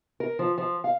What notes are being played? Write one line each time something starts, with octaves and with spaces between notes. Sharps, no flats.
A#4
F3
F3
F5